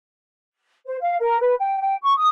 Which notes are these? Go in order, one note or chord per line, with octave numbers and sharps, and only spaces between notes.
C5
F5
A#4
B4
G5
G5
C#6
D#6